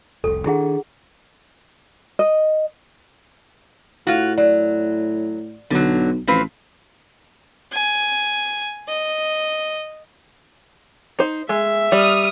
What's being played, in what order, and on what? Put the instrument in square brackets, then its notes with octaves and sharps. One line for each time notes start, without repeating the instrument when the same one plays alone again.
[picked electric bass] F1 C2 [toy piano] A4
[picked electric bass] D#3 D4 [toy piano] E4 G#4 F#5
[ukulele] D#5
[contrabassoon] A2 [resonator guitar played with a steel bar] F4 F#4
[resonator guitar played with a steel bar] F#3 [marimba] D5
[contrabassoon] B1 [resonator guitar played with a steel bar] D3 F#3
[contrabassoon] A1 [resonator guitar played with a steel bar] F3 C4 B4
[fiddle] G#5
D#5
[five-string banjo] D#4 C5
[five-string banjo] G#3 [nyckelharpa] E5
[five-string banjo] G3 [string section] D#6 F6